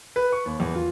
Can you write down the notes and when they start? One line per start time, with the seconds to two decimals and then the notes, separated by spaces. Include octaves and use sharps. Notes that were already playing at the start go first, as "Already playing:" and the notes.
0.16 B4
0.32 C#6
0.46 D#2
0.60 E2
0.75 F4